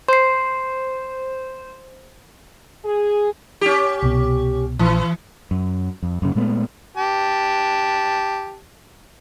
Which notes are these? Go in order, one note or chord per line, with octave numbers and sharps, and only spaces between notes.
C5 C6 C7
G#4
C#4 G4
C2 B2
A#1 E3
F#2
F2
F#2 C#3
A#2 G#3 A3 B3
G4 A5